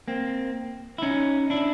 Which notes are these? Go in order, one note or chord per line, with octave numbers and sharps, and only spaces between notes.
A#3 C4
E4
C#4 D#4
D4 E4